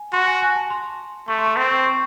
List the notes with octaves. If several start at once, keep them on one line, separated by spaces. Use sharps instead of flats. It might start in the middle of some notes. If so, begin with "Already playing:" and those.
Already playing: G#5
F#4 C6
G#5
G#5
A5
C6
A3 C#6
C6
A5
C4 C6
C#6
C#6